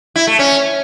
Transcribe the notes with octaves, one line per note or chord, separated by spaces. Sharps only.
E4
A3
C#4